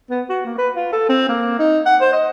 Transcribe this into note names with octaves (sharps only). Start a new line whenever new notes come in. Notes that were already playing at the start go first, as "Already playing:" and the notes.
B3
F#4
A#3
B4
F4
A4
C4
A#3
D#4
F#5
C5
D#5